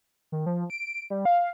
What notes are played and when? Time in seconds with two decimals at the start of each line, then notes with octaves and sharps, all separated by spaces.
0.32 D#3
0.46 F3
0.70 D7
1.10 G3
1.25 F5